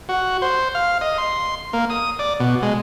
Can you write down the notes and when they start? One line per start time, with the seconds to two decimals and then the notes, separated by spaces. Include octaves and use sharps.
0.09 F#4
0.42 C5
0.75 F5
1.01 D#5
1.18 C6
1.73 A#3
1.90 D#6
2.19 D5
2.40 B2
2.62 G#3